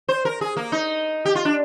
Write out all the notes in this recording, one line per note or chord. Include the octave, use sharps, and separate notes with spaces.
C5
A#4
G#4
A#3
D#4
G4
F4
D4